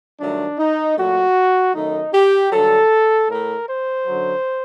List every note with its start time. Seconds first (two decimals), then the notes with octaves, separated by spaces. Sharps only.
0.20 G2 D#3 F#3 A3 D4
0.59 D#4
0.97 A#2 F#3 A3 F#4
1.75 F#2 D#3 A3 D#4
2.13 G4
2.52 G2 D3 F#3 A4
3.29 A2 A3 A#4
3.67 C5
4.07 F#2 D3 F#3